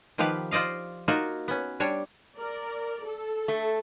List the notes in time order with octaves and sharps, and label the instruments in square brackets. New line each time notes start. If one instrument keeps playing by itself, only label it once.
[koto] D#3 F3 B3 G4 B4 F5
F4 C5 D5 D#5 F5
A#3 D#4 F4 F#4
B3 C#4
G3 D4 C#5
[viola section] A#4 D5
A4
[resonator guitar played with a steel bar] A3